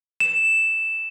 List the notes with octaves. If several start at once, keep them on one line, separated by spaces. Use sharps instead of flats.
E7